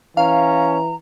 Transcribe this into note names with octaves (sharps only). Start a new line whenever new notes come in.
E3 C#4 F5 A#5